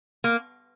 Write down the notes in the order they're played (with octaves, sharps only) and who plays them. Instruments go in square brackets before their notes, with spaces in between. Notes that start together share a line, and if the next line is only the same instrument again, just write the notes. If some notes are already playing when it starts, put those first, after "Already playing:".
[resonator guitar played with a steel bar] A#3